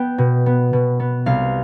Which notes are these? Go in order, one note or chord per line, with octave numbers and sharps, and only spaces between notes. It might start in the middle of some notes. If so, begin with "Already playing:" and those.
Already playing: B3 G5
B2
B3
B2
B3
C2 F5